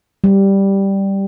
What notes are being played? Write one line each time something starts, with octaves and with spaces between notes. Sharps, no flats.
G3